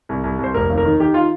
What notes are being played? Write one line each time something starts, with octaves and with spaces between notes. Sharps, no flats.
C2
C2
C2 C5
F1 A#4
D#2
A#4
D#3
D#3 G4
F4